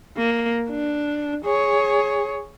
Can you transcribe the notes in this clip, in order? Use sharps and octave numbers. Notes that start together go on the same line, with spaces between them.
A#3
D4
G#4 C#5